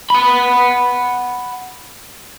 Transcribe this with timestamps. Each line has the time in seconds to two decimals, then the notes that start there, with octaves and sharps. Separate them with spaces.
0.10 F#5 B5